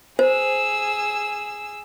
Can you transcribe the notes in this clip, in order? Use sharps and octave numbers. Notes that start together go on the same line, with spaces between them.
G#4 C5 E6